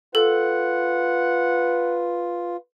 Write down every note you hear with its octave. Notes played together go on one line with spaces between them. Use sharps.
F4 A4 B4 F#5